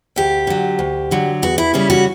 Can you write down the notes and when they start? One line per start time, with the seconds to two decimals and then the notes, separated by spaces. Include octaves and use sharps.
0.16 D2 G4
0.47 D3 F#3
0.79 D2
1.11 D3 F#3
1.42 E2 F#4
1.58 E4
1.74 C#3 G3 C#4 E4
1.90 F#4